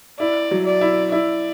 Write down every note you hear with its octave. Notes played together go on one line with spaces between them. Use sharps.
E4 D5
F#3
D5
E4
E4 D5